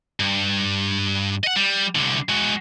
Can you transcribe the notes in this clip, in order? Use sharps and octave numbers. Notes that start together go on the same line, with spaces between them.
G2
D#5 F#5
G3
C2 D3
G#3 F#4